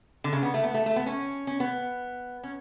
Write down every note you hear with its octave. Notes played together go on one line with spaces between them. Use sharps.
D3
C#3
B3
A3
B3
A3
A3
B3
C#4
C#4
B3
C#4